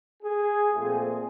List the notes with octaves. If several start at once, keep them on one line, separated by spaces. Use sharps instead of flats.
G#4
A#2 F3 A3 C4 G#4